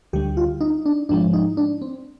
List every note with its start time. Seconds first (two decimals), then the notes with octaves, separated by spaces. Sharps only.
0.13 D2 D3 G3 G4
0.37 F4
0.61 D#4
0.86 D4
1.09 G#2 F3 G#3 D4
1.33 D#4
1.57 D4
1.82 C4